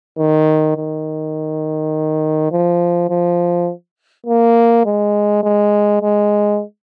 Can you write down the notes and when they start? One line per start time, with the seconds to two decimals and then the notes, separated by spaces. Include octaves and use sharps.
0.18 D#3
0.76 D#3
2.51 F3
3.10 F3
4.26 A#3
4.86 G#3
5.43 G#3
6.02 G#3